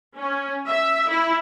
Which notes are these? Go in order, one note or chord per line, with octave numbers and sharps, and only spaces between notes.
C#4
E5
E4